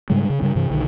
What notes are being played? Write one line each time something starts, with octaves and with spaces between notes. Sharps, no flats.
G#2 C#3 G3 G#3
C#3
G2 C#3 G3
G2 C3 E3
B1 D3 D#3